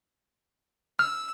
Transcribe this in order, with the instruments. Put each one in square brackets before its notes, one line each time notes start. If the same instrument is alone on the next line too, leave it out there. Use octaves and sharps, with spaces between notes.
[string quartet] E6 [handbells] F6